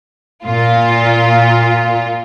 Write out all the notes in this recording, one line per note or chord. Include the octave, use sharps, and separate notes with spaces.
A#2 F4